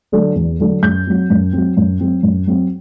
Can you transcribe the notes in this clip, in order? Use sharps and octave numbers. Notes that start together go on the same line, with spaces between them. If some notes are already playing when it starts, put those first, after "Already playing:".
D3 F#3 A3 D4
E2
D3 F#3 A3 D4
F#2 G6
F#3 C4
F#2
F#3 C4
F#2
F#3 C4
F#2
F#3 C4